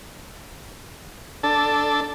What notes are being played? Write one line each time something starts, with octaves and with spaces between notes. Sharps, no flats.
D4 A4 A5